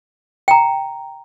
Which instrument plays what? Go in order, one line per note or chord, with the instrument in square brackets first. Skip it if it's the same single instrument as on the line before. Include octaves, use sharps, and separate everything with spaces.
[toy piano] G5 A#5